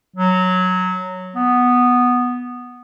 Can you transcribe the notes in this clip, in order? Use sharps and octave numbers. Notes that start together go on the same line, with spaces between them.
F#3
B3